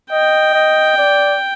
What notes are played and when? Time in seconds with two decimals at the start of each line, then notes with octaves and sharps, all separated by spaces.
0.11 D#5 G5
0.54 D#5
0.98 D5